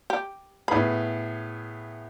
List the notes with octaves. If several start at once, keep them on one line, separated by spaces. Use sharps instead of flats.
G4
A2 B3 G#4 B5